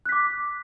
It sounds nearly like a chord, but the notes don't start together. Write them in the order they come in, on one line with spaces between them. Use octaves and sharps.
F#6 B6 D6